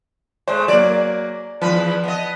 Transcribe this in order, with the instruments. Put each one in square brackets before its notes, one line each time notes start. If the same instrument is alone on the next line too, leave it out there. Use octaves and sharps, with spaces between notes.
[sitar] G#3 A3 [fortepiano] C5
[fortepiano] F#3 A#3 [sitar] D5
[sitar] E2 A#2 B4 [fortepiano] F3
[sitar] B3 D#5